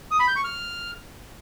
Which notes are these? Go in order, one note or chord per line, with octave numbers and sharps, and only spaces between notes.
D#6
B5
G6
C#6
F6